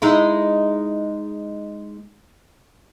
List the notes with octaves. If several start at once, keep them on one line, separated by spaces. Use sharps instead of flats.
G#3 D#4 E4